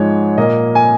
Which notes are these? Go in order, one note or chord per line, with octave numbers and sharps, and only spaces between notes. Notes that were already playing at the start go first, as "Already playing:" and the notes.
Already playing: G#2 F3 G#3 C#5
A#2 A#3 D#5
G#5